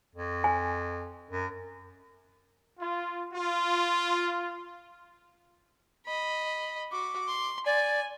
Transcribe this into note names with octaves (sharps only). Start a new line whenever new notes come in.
F2
G#5
F#2
F4
F4
D#5 B5
F#4 D6
C6
D5 G#5